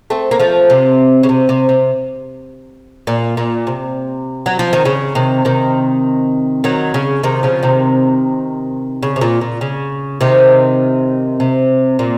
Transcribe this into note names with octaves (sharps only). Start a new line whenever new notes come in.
A3 C4
A#3
F3 A3
C3
C#3
C3
C3
C3
A#2
A#2
C3
F#3
F3
D#3
C#3
C3 D#3
C3 D#3
D#3 F#3
C#3
C3 D#3
C#3 F3
C3 D#3
C#3
C3
A#2
A#2
C#3
C3 D#3
C3
A#2